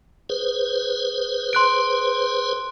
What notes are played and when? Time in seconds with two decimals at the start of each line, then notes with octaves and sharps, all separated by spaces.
0.29 G#4 B4 C5
1.53 C6 F#6 D7